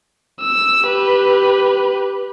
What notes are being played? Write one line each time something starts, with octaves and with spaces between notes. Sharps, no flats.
E6
G4 B4